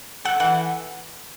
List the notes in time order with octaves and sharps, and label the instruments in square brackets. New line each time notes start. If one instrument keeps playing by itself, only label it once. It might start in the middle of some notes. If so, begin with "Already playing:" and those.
[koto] A4 [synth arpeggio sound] F#5
[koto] E3 [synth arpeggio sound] F#5